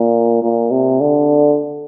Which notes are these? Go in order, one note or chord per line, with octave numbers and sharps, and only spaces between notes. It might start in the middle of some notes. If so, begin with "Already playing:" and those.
Already playing: A#2
A#2
C3
D3